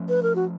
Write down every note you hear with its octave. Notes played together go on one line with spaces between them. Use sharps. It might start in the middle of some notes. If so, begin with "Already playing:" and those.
Already playing: F3 A3 C#4
B4
A#4
F#4